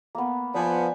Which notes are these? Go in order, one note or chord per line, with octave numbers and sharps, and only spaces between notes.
A#3 B3
F3 B3 D5 G#5 B5